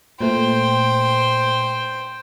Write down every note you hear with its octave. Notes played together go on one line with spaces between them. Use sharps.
A#2 A3 C5 G5